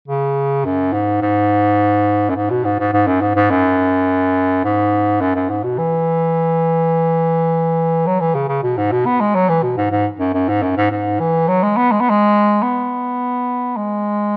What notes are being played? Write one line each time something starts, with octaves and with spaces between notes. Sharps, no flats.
C#3
F#2
G#2
G#2
F#2
G#2
B2
G#2
G#2
G#2
F#2
G#2
G#2
F#2
G#2
F#2
F#2
G#2
B2
E3
F#3
E3
C#3
C#3
B2
G#2
B2
B3
G#3
F#3
E3
B2
G#2
G#2
F#2
F#2
G#2
F#2
G#2
G#2
E3
F#3
G#3
B3
G#3
B3
G#3
B3
G#3